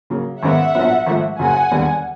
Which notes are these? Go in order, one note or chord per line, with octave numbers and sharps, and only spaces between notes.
C#3 F#3 A#3
G#1 F#2 D#3 G#3 B3 E5 F#5
A#1 A#2 F#3 B3
G#1 G#2 F3 A3
F#1 F#2 C#3 F#3 F#5 G#5
E1 D#2 D3 G3 B3